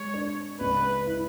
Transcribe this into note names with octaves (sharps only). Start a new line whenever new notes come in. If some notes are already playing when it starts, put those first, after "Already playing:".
Already playing: G#3 C#5
D4
C#2 B4
E4